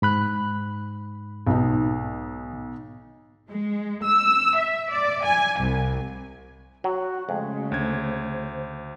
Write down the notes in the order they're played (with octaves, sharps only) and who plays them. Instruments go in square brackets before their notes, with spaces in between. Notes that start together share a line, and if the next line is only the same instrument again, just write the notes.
[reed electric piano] G#2 B5 F#6
[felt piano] B1 D#4
[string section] G#3
E6
E5
D5
G#5
C2
[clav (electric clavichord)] F#3 [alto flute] F#4
[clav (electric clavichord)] F2 [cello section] C#3 A3 [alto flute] G#3
[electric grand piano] D2 G#6 [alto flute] C5